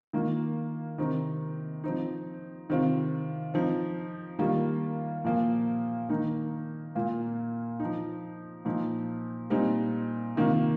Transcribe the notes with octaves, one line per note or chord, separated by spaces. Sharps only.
D#3 A#3 F4
C3 D#3 C4 D#4
F3 C4 D#4
C3 D#3 C4 F4
F3 C4 D#4
D#3 G3 A#3 F4
A#2 F3 A#3 F4
D#3 A#3 D#4
A#2 A#3 F4
D#4
F3
A#2 F3 D#4
A#2 G3 C4 D#4
C3 D#3 A#3 F4